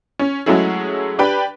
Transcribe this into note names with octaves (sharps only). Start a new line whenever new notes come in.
C#4
F#3 G#3 A3 C#4 E4 G#4
D4 G4 B4 G5 B5